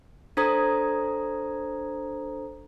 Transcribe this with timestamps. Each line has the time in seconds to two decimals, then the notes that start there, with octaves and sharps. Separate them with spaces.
0.37 D4 A4 C5 A#5 D#6 G#6